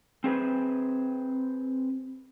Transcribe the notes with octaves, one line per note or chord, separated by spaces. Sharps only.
C4 G#4 B4 C5